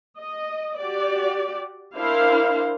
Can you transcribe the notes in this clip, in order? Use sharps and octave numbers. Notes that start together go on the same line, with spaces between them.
D#5
F#4 G4 D5
D4 E4 A#4 C5 F5